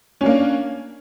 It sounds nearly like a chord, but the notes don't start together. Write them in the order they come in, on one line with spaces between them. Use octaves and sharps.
C#4 D4 A#3